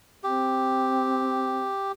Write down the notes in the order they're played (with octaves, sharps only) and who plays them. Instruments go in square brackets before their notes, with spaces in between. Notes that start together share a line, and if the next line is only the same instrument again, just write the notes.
[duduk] C4 [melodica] G4